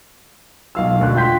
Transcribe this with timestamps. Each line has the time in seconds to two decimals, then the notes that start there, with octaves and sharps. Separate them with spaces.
0.75 B1 F5 E6
0.99 E1 D2 F#6
1.15 F4 G5 C6 G6 B6